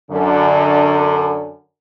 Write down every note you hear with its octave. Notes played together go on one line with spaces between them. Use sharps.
F#2 D3